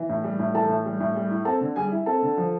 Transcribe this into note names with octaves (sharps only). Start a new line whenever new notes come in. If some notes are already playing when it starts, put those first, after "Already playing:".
Already playing: E3
A2
G3
A2
E3 A4 A5
A2
G3
A2
G3
E4
C4 A4 A5
D3
G3 G#4 G#5
E4
C4 A4 A5
D3
F3